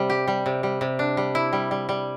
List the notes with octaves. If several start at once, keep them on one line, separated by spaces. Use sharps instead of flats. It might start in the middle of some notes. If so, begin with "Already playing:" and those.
Already playing: C3 G3
G4
G3
C3
G3
C3
D4
G3
E4
G3
G3
G3